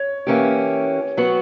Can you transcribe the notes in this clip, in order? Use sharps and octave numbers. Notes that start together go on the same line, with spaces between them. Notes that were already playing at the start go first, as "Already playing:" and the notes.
Already playing: C#5
E3 A#3 C#4 G4
F#3 B3 F#4